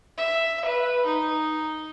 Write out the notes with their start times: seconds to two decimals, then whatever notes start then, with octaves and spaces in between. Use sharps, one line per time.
0.17 E5
0.65 B4
1.05 D#4